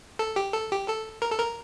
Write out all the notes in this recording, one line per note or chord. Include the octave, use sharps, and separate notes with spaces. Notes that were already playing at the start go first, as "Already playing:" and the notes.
A4
G4
A4
G4
A4
A#4
A4
A#4